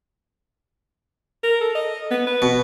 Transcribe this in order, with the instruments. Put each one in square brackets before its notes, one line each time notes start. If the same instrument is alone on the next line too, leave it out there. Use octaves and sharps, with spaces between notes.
[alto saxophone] A#4
A4
D#5
B3
B4
[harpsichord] B2